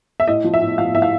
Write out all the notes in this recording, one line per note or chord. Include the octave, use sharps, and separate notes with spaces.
E5
A2 D#5
F3
E5
A2
F3 F5
A2 E5
F5